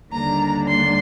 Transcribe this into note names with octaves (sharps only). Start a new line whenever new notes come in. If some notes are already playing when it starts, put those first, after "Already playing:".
D#2 D3 G3 A#3 D4 A#5
C6